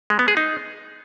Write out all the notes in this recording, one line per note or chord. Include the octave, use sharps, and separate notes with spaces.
G#3
B3
G#4
D#4